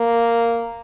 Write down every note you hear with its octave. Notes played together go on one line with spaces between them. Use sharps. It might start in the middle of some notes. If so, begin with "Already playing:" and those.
Already playing: A#3